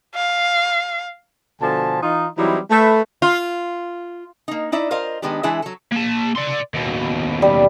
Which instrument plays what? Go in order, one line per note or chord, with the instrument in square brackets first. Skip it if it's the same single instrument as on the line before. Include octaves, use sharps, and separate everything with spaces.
[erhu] F5
[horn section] B2 D3 F3 G#5 A5
E3 D#4 F4
E3 F#3 G3 C4 D#4 E4
A3 B4
[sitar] F4
[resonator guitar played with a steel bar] A#3 D#4
D#4 E4 D5 E5
F4 A#4 C5 D#5 F5
D#3 G#3 B3 D4 G4
E3 G#3 D4 E4 G#4 E5
F#3 A4
[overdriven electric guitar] A#3 A5
D5 C6
D#2 B2
[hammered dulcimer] G3